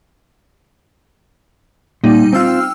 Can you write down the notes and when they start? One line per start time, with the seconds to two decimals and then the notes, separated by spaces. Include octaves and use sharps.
2.04 A#2 G3 D#4
2.33 C4 F4 G5 E6 F6